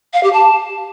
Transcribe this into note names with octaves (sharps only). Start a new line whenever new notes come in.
F5
G4
A5